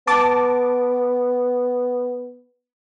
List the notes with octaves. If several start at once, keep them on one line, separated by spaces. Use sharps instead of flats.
B3 A5 D6